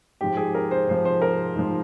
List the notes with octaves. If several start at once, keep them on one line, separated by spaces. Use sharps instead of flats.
G#2 F3 G4
G#4
A#4
C5
G#2 F3 C5
C5
A#4
G#2 F3